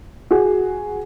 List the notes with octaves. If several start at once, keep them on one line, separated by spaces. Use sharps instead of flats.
F#4 G#4